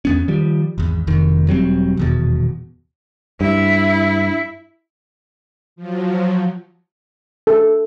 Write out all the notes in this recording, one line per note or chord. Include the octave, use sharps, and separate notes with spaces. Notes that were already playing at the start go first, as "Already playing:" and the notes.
E2 B3 C#4
D#3 F3 G3
G#1 E2
F1 F2 D#3
E1 F#3 G3 C4
D#1 E2 B2
G2 E4
F3 F#3
A4